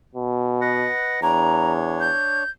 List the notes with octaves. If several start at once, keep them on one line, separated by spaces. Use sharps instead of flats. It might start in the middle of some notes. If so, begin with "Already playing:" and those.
B2
B4 D#5 F#5
E2 D4 C#5 A#5
G6